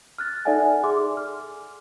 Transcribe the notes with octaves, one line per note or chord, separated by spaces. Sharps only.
F6 F#6 A6
D#4 A4 D5 E5 F#5 G#5
G#4 C6 D6
F6